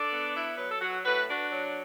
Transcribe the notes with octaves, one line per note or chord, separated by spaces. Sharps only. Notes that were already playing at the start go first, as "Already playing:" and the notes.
Already playing: D4 A4 D5
B3
E4
F#3 B4
A4
F#3 F#4
A2 F#4 B4
D4 F#4
F#3